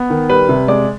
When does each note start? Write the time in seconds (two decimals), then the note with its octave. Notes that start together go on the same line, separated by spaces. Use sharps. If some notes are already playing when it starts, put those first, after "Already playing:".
Already playing: B3
0.10 D#3
0.29 G3 B4
0.49 C3
0.68 G#3 D5